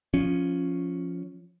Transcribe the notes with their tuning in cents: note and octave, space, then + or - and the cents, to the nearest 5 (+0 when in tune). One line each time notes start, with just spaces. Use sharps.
F3 +0 C#4 +0